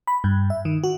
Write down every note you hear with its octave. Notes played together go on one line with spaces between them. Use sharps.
B5
G2
E5
D#3
F#4